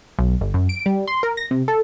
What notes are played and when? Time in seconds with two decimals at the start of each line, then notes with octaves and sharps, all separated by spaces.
0.19 B1
0.41 G1
0.54 F#2
0.69 D7
0.86 G3
1.08 C6
1.23 A#4
1.37 A#6
1.51 C3
1.68 A4